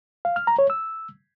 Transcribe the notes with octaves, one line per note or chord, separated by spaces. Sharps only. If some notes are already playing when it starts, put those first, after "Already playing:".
F5
F6
A#5
C#5
E6